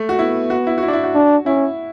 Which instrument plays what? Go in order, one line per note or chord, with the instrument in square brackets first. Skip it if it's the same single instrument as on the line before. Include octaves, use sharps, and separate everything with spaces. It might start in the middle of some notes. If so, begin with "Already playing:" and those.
Already playing: [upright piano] A3
F#4
[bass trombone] B3 [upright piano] E4
[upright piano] F#4
E4
F#4
E4
D4
E4
F#4
[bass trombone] D4
[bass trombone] C#4 [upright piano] E4